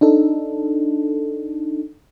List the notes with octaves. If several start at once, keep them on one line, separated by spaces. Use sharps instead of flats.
D4 D#4 A4